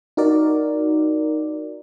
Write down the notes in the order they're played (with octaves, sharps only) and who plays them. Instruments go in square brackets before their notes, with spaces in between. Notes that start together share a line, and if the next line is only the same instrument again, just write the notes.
[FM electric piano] D#4 F#4 A#4 D5